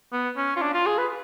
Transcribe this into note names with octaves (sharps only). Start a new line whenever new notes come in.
B3
C#4
F4
D4
F4
G#4
B4